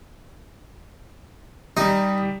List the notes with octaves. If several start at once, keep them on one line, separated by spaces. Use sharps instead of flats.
G3 D#4 G4